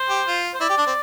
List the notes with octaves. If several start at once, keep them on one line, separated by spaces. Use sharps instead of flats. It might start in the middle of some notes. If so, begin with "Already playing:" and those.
Already playing: C5
G4
F4
C5
E4 D5
G4
D4
C4